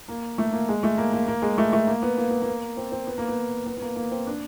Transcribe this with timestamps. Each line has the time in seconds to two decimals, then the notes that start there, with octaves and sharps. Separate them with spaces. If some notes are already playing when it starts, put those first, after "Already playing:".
0.08 A#3
0.38 A3
0.53 A#3
0.69 G#3
0.83 A3
0.98 A#3
1.13 A#3
1.28 A#3
1.42 G#3
1.58 A3
1.73 A3
1.87 A#3
2.03 B3
2.18 A#3
2.30 B3
2.42 A#3
2.77 C4
2.92 C4
3.07 B3
3.18 A#3
3.28 B3
3.66 B3
3.77 B3
3.82 A#3
3.96 A#3
4.11 C4
4.27 D4